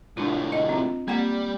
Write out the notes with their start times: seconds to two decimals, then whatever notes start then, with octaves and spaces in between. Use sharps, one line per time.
0.17 C2 A2 D4 F4
0.52 D#5
0.69 C4 F4
1.08 G3 A#3 C4 F#5